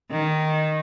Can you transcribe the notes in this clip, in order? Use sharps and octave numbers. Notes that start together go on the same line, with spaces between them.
D#3